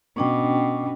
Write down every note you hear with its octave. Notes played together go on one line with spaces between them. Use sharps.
B2 C#4 D4 G5